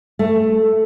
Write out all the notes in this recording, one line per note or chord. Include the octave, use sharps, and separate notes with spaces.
A3